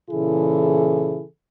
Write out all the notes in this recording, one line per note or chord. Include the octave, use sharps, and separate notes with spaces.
A#2 C#3 E3 E4 G#4 A4